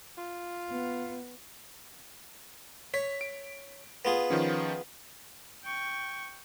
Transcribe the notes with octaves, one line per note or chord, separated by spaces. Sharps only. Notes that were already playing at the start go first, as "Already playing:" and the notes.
F4
B3
C#5 B6
D7
B3 F4 G#4
D#3 F3 C#4
G5 C#6